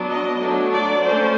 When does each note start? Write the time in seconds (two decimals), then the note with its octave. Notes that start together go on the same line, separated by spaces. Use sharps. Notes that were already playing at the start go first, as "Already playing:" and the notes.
Already playing: F#3 B3 D4
0.10 D#5
0.41 F#3 A3 D4
0.72 D5
1.04 A3 C#4 C5